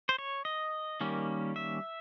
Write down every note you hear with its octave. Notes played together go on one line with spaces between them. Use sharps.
C5
C#5
D#5
D#3 G3 A#3 C#4
E5